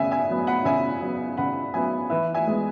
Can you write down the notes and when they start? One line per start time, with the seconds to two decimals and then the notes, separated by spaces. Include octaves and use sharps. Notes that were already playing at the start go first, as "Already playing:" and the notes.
Already playing: C#3 B3 E5 G#5
0.11 E5 G#5
0.30 F#3 B3
0.47 F#5 B5
0.65 C#3 E5 G#5
1.02 F#3 B3
1.37 C#3 F#5 B5
1.74 F#3 B3 E5 G#5
2.10 E3 B4 E5
2.35 E5 G#5
2.47 G#3 B3